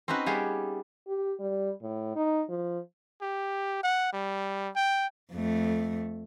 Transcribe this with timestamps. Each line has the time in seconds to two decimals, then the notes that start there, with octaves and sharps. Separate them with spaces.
0.08 C4 C#4 D#4 F#4 B4
0.26 G3 A#3 B3 G4 G#4
1.07 G4
1.40 G3
1.82 A2
2.16 D#4
2.49 F3
3.21 G4
3.83 F#5
4.13 G3
4.76 G5
5.32 F2 A3